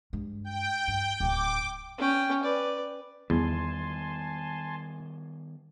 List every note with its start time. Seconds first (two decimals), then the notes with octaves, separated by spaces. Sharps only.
0.13 G2 G#3
0.44 G5
0.88 G2
1.20 D1 A2 D6
1.98 C#4 G5
2.43 B4 D5
3.30 E2 D#3 G3 B3 G#5 A5 C6